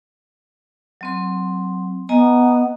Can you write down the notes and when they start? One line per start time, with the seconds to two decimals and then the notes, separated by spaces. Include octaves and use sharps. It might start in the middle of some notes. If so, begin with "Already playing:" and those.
1.01 F#3 C4 C6
2.09 B3 D#5 G#5 A#5